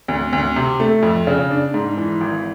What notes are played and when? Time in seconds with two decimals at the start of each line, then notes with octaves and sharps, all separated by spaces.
0.08 D2
0.33 D2
0.56 C3
0.80 A3
1.03 F2
1.27 C#3
1.51 D4
1.74 G#2
1.97 E3
2.21 G#1